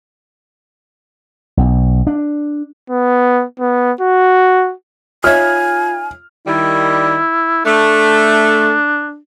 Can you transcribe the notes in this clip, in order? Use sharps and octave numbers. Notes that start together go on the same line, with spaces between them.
B1
D4
B3
B3
F#4
D#4 F4 C#5 E5 G#5 F6 G#6
D#3 G3 E4
A3 D4